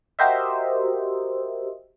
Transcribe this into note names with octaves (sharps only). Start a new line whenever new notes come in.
F#4 G4 A#4 C5 D#5 E5